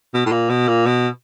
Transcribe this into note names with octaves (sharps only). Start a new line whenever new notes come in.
B2
A2
A#2
B2
A#2
B2